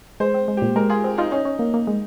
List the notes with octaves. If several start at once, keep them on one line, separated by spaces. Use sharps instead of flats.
G#3 C5
C4
G#3
A#2 G4
G#3 A#4
F4 G#4
C4
D#4 F4
C#4 D#4
C#4
A#3
A#3
G#3